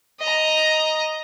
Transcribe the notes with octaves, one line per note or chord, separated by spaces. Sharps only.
D#5 A#5